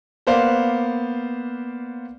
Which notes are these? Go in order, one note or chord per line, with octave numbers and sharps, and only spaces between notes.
A#3 B3 B4 C5 D5 F5